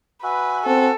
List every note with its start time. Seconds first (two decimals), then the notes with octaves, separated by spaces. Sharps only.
0.23 F#4 B4 E5 G#5
0.66 C4 F#4 A4